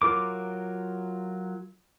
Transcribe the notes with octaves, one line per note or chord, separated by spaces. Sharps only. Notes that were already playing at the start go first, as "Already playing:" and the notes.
F#3 F4 A#4 D6